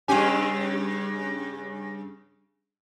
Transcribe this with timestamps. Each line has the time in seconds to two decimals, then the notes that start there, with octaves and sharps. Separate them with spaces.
0.08 G2 C#3 C#4 G4 G#5